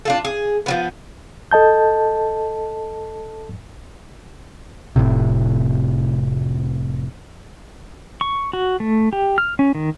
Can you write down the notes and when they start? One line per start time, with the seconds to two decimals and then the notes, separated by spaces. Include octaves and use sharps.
0.05 D4 F4 A4
0.25 G#4
0.66 F3 F#3 B3
1.51 A4 D#5 A5 G6
4.96 F1 A#1 A2 C3
8.21 C#6
8.53 F#4
8.80 A3
9.13 G4
9.38 F6
9.59 C#4
9.75 D#3